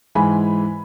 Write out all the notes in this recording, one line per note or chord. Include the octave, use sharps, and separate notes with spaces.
G#2 E3 G#3 G#5 B5